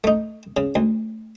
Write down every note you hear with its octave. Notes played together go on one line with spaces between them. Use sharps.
A3 D#4
C#3
D2